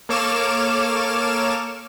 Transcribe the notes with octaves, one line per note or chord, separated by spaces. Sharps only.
A#3 A4 C#5 D6 F6 E7